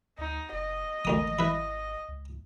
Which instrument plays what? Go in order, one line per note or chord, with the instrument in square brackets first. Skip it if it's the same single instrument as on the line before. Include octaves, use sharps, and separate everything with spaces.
[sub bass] D2 [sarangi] D#4
[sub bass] F#1 [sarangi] D#5
[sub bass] G#1 [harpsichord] D2 A#3 D#6
[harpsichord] E4 B4
[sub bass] C#2